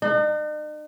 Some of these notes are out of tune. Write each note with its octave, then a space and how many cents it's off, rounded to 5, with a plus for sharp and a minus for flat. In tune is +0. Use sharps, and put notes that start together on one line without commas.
D#4 -45